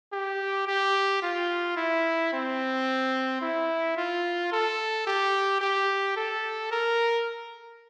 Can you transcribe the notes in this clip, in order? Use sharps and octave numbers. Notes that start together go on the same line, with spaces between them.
G4
G4
F4
E4
C4
E4
F4
A4
G4
G4
A4
A#4